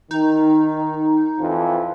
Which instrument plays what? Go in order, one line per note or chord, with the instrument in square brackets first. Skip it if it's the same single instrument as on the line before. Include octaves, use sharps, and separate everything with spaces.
[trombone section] D#3 [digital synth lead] D#4
[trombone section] F2 E3 F3